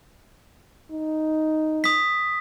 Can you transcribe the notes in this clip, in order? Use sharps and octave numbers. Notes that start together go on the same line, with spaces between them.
D#4
D#6 B6